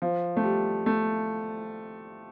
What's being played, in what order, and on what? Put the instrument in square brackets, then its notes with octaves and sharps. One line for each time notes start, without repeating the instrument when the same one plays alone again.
[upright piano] F3
A3
G3
A3